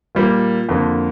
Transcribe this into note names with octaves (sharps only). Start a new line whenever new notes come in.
A#2 G3 A#3
F2 D3 A#3